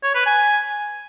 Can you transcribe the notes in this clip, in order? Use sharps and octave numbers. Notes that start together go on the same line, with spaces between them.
C#5
B4
G#5